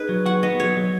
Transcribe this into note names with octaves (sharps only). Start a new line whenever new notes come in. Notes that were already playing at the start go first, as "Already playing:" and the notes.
Already playing: D#4 G#4 B4
F#3
F#4 F#5
B3 D#5
F#3 C#5
F#3